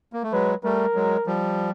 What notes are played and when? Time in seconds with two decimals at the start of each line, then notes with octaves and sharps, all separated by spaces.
0.13 A#3
0.23 A3
0.32 F#3 G#3 B4
0.64 G3 A3 A#4
0.95 F#3 G#3
1.26 F3 G3